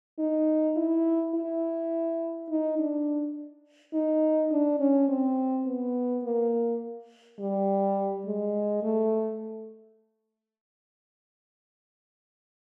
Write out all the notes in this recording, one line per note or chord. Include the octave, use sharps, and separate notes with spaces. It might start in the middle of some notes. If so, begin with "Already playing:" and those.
D#4
E4
E4
D#4
D4
D#4
D4
C#4
C4
B3
A#3
G3
G#3
A3